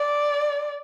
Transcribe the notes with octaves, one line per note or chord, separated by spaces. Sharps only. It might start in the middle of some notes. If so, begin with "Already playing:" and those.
Already playing: D5